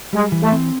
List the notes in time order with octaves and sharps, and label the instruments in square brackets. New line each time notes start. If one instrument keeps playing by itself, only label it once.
[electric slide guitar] G3 [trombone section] G#3
[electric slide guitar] E3
[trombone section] A3
[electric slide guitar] C4